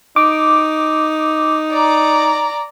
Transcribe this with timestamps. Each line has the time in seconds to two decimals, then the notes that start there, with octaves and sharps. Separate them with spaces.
0.16 D#4 D6
1.72 D5 A#5